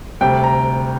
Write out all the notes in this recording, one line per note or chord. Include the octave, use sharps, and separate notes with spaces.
D2 C3 G3 G5
A#5